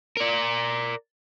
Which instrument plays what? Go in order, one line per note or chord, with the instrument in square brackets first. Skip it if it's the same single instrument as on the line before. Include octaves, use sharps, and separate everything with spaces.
[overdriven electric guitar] A#4 D5